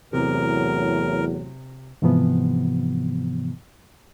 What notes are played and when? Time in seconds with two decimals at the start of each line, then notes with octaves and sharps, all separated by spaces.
0.13 E2 A2 C3 F#3 A#4
2.02 G#2 C3 E3 F3 B3